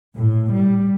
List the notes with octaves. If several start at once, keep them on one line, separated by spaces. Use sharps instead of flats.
A2
G3